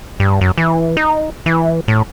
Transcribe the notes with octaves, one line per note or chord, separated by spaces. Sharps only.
G2
F#2
E3
D#4
E3
A2